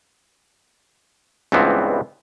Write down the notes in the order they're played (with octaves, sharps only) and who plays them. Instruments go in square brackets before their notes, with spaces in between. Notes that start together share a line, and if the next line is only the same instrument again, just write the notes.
[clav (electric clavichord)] C#2 G2 E3 G3 B3 C4